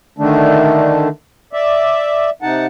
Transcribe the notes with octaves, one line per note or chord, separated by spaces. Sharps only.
D3 D#3 A3 D4
D5 E5
C3 D#4 F#5 A5